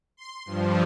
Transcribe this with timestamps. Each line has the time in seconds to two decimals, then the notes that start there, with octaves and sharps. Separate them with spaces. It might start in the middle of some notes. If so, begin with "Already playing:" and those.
0.17 C6
0.45 G2 F3